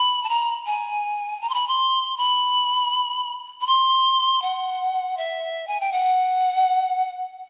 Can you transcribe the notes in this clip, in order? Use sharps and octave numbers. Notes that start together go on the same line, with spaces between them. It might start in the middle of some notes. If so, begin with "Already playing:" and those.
Already playing: B5
A5
A#5
G#5
A#5
C6
B5
C6
B5
B5
C6
F#5
E5
G#5
G5
F#5